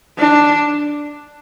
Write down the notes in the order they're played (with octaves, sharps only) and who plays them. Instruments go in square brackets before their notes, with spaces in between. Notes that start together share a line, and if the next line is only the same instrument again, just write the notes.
[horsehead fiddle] D4